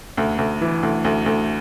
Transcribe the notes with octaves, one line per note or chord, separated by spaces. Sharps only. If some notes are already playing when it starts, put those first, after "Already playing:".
D2
D2
E3
D2
D2
D2